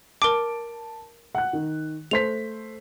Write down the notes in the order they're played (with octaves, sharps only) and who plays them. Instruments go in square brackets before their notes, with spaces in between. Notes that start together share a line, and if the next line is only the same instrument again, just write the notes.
[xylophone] A#4 D6 [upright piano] A5 D7
[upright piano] F#5 F#6
D#3
[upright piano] A3 C5 B6 [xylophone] F7